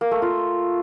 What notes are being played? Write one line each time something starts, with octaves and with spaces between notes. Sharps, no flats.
A#3
A3
F4